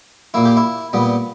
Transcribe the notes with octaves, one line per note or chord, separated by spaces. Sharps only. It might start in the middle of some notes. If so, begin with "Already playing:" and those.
A#2 A#3 E4
G4
E4
A#2 G3 B3